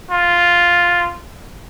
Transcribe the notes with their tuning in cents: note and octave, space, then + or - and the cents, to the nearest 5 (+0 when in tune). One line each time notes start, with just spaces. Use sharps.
F4 +0